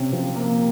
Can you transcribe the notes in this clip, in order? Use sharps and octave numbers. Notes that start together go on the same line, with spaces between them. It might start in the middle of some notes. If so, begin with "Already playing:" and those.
Already playing: C3 C#4
F3
A#3